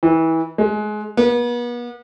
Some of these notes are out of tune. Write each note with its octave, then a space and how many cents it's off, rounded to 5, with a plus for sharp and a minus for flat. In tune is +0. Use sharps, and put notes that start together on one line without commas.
E3 -25
G#3 +25
B3 -40